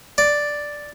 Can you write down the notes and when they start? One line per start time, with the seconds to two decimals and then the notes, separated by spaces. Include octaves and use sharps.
0.18 D5